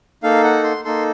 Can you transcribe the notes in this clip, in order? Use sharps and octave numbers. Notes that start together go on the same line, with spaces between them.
A#3 D#4 A4 F5
F#5
C6
A#3 D#4 A4 C6